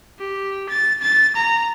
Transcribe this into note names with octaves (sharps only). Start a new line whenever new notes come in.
G4
A6
A6
A#5